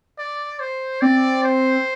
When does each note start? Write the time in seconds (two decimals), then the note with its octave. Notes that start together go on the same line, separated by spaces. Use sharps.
0.18 D5
0.60 C5
1.02 C4 D5
1.44 C5